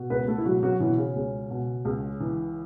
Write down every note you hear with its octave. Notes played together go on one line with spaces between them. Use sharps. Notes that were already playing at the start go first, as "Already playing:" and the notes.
Already playing: B2
C#2 B3 B4
A3 A4
E4
B2 F#3 F#4
F#3 F#4
B2 E3 E4
C#3 C#4
C#2
B2
C#2
E3